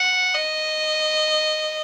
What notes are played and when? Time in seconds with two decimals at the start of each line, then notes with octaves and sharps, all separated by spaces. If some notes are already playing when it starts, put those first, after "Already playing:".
Already playing: F#5
0.35 D#5